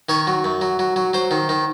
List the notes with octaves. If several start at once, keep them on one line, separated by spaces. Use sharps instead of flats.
D#3 C#5
F#3
F#2
F#3
F#3
F#3
F#3 C5
D#3
D#3